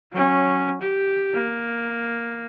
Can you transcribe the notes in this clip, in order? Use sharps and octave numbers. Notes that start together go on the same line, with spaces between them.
F#3 C#4
G4
A#3